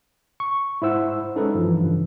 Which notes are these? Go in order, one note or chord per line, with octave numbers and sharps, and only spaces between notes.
C#6
G#2 E4 C5 E5 F#5 E6
G#3 C#4 D#4 A4 B4
G2 E3 F3
F2 C#3